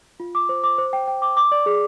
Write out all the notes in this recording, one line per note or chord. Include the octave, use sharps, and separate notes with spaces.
F4
D6
C5
D6
C5
G5
G5
D6
D6
D5
G#4